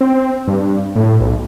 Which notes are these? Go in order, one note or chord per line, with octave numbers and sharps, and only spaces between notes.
C4
G2
A2
B1